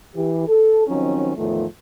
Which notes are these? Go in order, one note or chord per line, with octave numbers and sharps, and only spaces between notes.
E3 G4
A4
D#3 F3 F#3 C4 C#4 D#4
E2 A2 D#3 F3 A3 F4